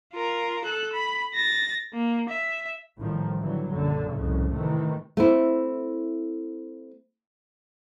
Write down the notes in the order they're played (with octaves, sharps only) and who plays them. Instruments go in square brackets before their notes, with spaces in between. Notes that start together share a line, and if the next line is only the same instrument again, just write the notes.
[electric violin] F4 A#4
A4 F#6
B5
A6 A#6
A#3
E5
[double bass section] A1 A2 D#3 F3 G3
D3 E3 F#3 G3
A#1 F#2 D3
C2 F2 A2 C#3
A2 C3 D#3 E3 A3
[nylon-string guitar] A3 C4 E4